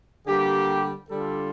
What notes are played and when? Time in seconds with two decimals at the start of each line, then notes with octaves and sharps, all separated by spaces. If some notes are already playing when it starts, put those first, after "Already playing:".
0.27 D3 G3 A#3 G4
1.08 D3 G3 D4 F4 A4